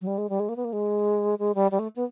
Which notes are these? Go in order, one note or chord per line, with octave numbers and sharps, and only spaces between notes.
F#3
G3
G#3
G3
G#3
A#3
B3
A#3
G#3
G#3
G3
G3
A3
B3